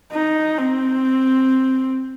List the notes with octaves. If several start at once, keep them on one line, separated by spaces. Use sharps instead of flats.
D#4
C4